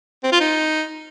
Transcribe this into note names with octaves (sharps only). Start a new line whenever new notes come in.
C4
F4
D#4